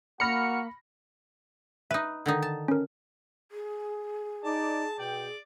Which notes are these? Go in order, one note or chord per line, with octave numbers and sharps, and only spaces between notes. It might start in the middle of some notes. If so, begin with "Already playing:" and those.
A#3 F#4 B5 F6 A#6 C#7
D#4 B4 E5
D3 D#3 D#4
A5
C#4 A#4
G#4
D#4 D5 A5
B2 D5 G5